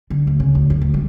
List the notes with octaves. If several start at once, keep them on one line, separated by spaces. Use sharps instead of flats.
D3
D2
C#3
D2
F#2
D2
G3